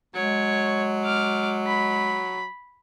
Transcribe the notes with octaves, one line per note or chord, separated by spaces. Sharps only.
F#3 G#3 C#5
D6 F6
B5